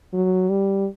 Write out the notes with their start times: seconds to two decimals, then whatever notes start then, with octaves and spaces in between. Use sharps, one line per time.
0.13 F#3
0.49 G3